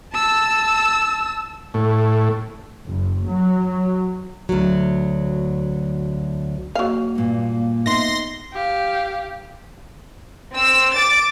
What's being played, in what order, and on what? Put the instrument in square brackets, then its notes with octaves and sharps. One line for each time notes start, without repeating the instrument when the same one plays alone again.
[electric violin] A5 E6
[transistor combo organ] A2
[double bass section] F#1
F#3
[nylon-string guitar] D2 F#3
[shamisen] F#3 F5 [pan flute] A#3
[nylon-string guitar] G2 A#2
[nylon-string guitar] B3 D#4 E5 [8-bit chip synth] C6 A#6
[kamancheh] G4 F5
[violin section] C4 E6
D6 A6